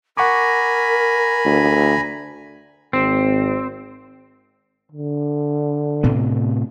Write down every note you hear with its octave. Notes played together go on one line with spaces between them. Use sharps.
A#4 F#5 G#5 A#5 B5 C#6 D6
D2
G#1 C4
D3
A2 C3 B3